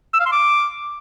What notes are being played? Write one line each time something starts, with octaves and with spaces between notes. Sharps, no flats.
E6
F5
C6
D6